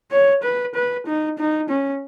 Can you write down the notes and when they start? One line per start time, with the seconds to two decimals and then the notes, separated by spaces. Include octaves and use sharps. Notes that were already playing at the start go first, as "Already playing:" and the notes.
0.11 C#5
0.43 B4
0.75 B4
1.06 D#4
1.38 D#4
1.69 C#4